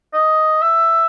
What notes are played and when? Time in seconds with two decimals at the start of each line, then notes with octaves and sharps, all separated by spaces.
0.14 D#5
0.62 E5